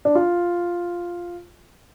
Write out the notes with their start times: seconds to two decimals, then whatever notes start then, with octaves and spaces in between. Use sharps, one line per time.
0.05 D4
0.15 F4